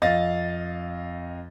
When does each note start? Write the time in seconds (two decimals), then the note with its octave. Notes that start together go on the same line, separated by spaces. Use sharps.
0.02 F2 D#5 F5 A6